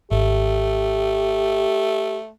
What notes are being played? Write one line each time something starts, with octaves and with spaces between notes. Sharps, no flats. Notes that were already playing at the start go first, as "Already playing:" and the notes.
G#1 A3 G4